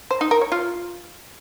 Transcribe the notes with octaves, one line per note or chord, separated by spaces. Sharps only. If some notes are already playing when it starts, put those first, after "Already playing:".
C5
D#4
A#4
C#5
F4